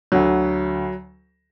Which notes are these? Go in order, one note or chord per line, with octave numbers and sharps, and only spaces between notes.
D2 D3 F#3